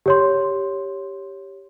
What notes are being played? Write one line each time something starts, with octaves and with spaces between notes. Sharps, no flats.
G4 C#5 C6